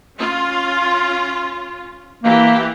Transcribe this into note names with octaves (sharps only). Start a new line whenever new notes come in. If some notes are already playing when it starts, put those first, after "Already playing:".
C#4 F4
E3 A#3 G4